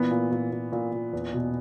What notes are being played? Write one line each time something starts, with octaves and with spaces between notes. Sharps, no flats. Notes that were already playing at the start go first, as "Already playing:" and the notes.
Already playing: A#2 E3 B3
A#2
A#2
A#2
A#2
A#2
E2
B2